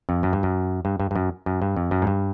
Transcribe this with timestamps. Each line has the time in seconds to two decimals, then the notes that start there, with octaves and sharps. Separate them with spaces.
0.09 F2
0.23 F#2
0.33 G2
0.43 F#2
0.85 G2
1.00 G2
1.11 G2
1.16 F#2
1.46 F#2
1.62 G2
1.76 F2
1.91 F#2
2.02 G#2
2.07 G2